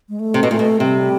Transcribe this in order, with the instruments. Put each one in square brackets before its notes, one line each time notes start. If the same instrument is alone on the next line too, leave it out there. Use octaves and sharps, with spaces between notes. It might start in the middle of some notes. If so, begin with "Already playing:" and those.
[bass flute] G#3
A3
[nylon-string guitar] C3
B2
[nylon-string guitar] A#2 [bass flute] A3
[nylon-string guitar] B2
[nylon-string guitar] C3 [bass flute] G3